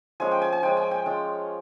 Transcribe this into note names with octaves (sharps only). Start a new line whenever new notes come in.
F3 G#3 C#4 G#5
G5
G#5
G#5
F3 G#3 C#4 G5
G#5
G5
G#3 C#4 F4